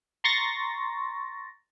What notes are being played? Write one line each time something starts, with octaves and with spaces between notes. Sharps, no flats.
A#5 C6 C#6 A6 A#6